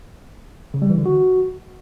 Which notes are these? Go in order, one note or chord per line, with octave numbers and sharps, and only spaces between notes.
C#3
G3
E3
D3
F#4